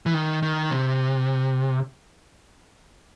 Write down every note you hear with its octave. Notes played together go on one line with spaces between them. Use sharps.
E3
D#3
D#3
C3